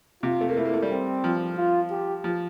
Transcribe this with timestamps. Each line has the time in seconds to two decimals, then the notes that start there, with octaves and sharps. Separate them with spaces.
0.23 C3 F4
0.41 A3
0.49 A#3
0.57 A3 E4
0.65 A#3
0.73 A3
0.82 G3
0.90 C4
1.24 F3
1.57 F4
1.91 G4
2.24 F3